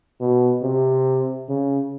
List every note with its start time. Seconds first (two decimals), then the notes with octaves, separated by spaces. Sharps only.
0.20 B2
0.63 C3
1.49 C#3